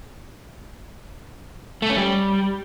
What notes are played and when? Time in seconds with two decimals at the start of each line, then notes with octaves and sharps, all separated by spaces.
1.82 A3
1.90 C#4
1.97 G3